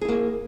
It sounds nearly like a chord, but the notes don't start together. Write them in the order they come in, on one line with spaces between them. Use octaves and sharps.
G#4 E4 A#3